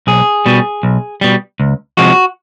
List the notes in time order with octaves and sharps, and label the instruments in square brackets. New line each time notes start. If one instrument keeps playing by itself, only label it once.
[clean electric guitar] B1 G#4
B2 G3
B1
B2 G3
C#2
C3 F3 G#3 F#4